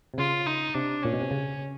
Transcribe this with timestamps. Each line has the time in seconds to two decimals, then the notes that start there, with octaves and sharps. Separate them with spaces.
0.14 C3
0.18 C#3 F4
0.46 D#4
0.75 C3 D4
1.03 A#2 C#4
1.13 B2
1.21 C3
1.31 C#3